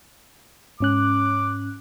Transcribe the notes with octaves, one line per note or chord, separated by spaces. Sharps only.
G#2 C#4 D6 F#6